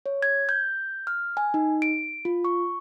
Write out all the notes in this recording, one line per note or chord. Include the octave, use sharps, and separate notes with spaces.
C#5
G#6
G6
F6
G#5
D#4
D7
F4
C#6